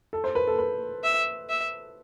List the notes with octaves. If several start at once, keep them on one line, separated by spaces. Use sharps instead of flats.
A4
C5
B4
A4
B4
E5
E5